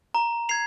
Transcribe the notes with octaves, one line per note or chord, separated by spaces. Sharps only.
A#5
G#6 C7 F7